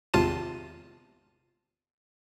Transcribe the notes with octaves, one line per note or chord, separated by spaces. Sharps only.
G#1 E2 C3 F4 A5 D#7